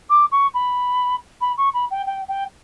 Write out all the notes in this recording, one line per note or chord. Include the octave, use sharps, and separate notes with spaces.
D6
C#6
B5
B5
C#6
B5
G5
G5
G5